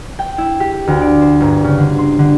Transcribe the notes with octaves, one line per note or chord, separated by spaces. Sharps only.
G5
E4
G4
D2
D5
C5
G1
C#3
D3
C6
D3